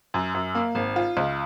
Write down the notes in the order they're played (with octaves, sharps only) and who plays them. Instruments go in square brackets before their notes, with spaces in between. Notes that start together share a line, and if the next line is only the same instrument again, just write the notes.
[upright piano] F#2
F#2
A#3
G#1
F4
C#2